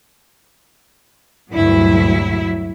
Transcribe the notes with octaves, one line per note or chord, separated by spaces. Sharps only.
D2 G2 A#2 F#3 E4